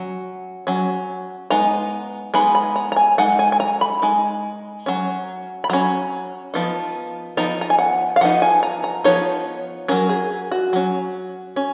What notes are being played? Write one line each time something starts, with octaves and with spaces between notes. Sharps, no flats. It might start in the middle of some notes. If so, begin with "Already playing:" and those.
Already playing: F#3 C#4
F#3 C#4
G#3 B3 D#4 A#5
G#3 B3 D#4 B5
B5
A#5
A#5
G#5
G#3 D#4 F#5
G#5
G#5
A#5
B5
G#3 D#4
F#3 C#4
B5
F#3 C#4 A#5
F3 B3 D#4
F3 B3 D#4 A#5
A#5
G#5
F#5
F5
F3 B3 D#4 F#5
G#5
A#5
A#5
F3 B3 D#4 C#5
F#3 C#4 A#4
G#4
F#4
F#3 C#4
C#4